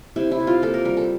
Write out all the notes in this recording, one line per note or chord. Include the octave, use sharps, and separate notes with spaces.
C3 E4
E4
C3
F4
A#3 A4
A#4
G3 A#4
A4